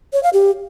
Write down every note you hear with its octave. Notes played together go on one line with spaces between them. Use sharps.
C#5
F5
G4